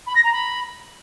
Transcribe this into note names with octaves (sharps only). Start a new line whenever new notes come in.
B5
A#6
A#5
B5